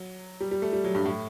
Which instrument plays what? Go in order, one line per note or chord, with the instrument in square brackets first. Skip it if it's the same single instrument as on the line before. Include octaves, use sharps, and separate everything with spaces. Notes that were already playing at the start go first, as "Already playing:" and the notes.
Already playing: [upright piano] F#3
G3
G3
A3
G3
F#3
G2
A2